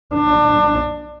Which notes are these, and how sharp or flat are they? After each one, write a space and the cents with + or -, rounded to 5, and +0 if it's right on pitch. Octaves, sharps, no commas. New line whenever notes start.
D4 +25